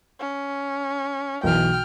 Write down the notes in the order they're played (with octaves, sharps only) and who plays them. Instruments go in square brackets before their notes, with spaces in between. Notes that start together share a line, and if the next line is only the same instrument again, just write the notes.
[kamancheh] C#4
[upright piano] B1 E3 [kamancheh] G5 F6